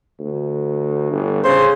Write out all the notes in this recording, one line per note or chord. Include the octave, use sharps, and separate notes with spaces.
D2
G1
C#3 C5